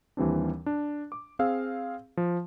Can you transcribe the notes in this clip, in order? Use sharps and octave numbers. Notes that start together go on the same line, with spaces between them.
D#2 E3 G3 C4 D4
D4
D6
C4 G#4 F5 E6
F3